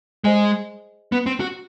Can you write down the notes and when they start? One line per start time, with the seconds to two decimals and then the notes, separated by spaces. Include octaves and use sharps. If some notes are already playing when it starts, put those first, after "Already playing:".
0.24 G#3 G#4 C5 D#5 G#5
1.12 B3
1.26 C4
1.40 F#4